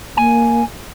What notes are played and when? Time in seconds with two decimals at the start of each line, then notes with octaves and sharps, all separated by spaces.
0.17 A#3 G#5